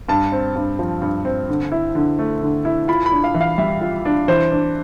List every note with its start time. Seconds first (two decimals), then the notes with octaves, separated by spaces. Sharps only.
0.08 G2 A5
0.32 C4
0.55 G2
0.79 F3
1.02 G2
1.25 C4
1.49 D3
1.72 E4
1.95 D3
2.19 A3
2.42 D3
2.65 E4
2.88 F4 B5
3.06 B5
3.12 D4
3.24 F5
3.34 E3
3.41 F5
3.58 G3 E5
3.81 F4
4.05 D4
4.28 E3 C5
4.52 D4